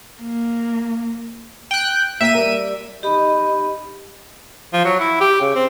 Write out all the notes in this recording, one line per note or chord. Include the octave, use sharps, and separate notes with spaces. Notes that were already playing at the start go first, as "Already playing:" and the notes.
A#3
G5 F#6
A#3 E5 G5 D#7
G3 A#4
D#4 G4 D#5 B5
F3
F#3
E4
G4
C#3
C4